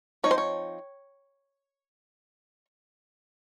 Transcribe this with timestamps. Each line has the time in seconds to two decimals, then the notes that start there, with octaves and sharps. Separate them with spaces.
0.24 F3 C4 D#4 C#5
0.31 C5
0.38 C#5